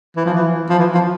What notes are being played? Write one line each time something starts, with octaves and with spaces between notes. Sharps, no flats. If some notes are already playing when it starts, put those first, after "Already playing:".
E3
F3
E3
F3
E3
F3